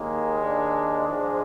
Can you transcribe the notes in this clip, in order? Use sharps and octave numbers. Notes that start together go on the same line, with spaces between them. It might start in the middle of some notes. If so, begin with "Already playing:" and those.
Already playing: D#2 D#3 G#3 A#3
D4
G#2 F3 G#3